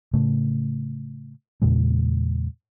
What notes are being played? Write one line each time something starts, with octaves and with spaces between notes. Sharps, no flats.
A2 C#3 A3
E2 A#2 C#3 G#3